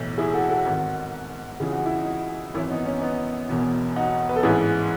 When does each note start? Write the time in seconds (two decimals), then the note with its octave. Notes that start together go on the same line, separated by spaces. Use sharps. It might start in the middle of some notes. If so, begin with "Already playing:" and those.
Already playing: B1 A2 E3
0.18 E4 G#4
0.33 F#4 A4
0.49 F#4 A4
0.65 G#1 G#2 D#3
1.60 C#2 C#3 E3 G#4
1.72 F#4
1.86 E4
1.98 D#4 F#4
2.54 G#1 F#2 E3 C#4 E4
2.70 B3 D#4
2.85 C#4
3.01 B3 D#4
3.49 E1 E2 B2
3.96 D#4 F#4
4.29 B4
4.36 A4
4.43 A1 G#2 E3 E4 G#4